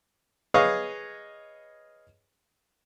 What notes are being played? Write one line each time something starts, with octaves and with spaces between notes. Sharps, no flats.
G#4 B4 C#5 D#5 F5